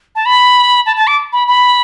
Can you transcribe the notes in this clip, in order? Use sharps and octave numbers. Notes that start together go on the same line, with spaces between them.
A5
B5
A5
A5
D6
B5
B5